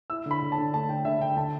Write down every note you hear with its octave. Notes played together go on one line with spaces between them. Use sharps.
E4 E6
D3 B5
D3
A5
D3
A3 A5
D3 G5
D3 E5
D3 G5
D3 A5